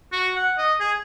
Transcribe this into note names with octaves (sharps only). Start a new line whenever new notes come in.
F#4
F#5
D#5
G#4